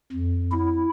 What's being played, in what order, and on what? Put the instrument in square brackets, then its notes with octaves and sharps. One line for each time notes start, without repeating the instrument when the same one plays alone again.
[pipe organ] F2
E4